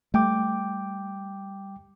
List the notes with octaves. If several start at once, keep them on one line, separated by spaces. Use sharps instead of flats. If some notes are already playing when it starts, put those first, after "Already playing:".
G3 A3 G5 D6